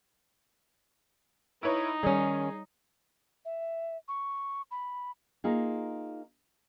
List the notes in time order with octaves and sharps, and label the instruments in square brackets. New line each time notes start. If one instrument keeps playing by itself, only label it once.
[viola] D#4 [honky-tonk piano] E4 B4 C#5
[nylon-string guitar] D#3 C#4 [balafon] G3 C#5 [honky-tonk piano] G#4
[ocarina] E5
C#6
B5
[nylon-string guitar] A#3 D#4 F4 G#4